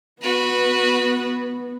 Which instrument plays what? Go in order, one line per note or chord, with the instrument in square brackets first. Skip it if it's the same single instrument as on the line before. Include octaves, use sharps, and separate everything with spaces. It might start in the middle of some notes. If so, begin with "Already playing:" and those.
[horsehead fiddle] B3 [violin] F#4 B4